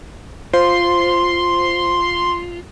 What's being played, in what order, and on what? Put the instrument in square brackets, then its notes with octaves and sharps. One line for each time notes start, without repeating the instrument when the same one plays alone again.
[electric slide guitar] F4 [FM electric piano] C5 [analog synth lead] C6